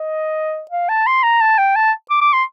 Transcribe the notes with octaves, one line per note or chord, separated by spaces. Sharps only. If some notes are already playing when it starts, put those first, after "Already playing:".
Already playing: D#5
F5
A5
C6
A#5
A5
G5
A5
D6
D6
C6